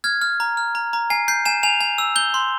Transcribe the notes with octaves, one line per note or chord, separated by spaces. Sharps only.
F6 G#6
F6
A#5
F6
A#5
A#5
G#5 C7
G6 C7
G#5 E7
G#5 F7
G#5
E6
G6 G7
C6